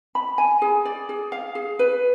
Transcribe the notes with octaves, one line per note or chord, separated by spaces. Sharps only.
B5
G#5
G#4
D5
G#4
F5
G#4
B4